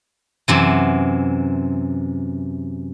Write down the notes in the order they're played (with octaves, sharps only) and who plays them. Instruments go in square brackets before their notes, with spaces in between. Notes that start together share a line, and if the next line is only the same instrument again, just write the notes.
[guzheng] F#2 C3 E3